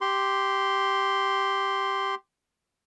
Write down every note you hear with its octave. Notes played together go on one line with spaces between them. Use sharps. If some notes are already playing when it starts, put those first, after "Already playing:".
G4 C6